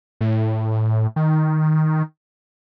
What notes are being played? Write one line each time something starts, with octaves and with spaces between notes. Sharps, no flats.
A2
D#3